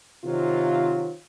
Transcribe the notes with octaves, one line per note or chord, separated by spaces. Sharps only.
C3 D#3 F#3 C4 F4